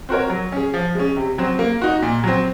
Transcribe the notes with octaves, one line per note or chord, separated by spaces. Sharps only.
C4 F#4 A#4 C#5
F#3
C#4 G#4
F3
G#3 C#4
C3
F#3 C4
A#3
D#4 F#4
A#2
F#3 C4